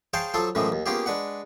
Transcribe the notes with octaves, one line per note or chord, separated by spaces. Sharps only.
G#4 C5 C#5 F5 G5 A5
F3 F#3 F4 A4 A5
F#2 A2 C#3 E3 F3 G#3
D#2
A#3 B3 C#4 F4 G4 G#4
G#3 D4 B4 F#5